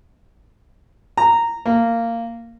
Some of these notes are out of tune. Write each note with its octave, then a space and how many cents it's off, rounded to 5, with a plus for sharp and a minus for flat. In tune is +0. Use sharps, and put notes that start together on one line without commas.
A#5 -10
A#3 -15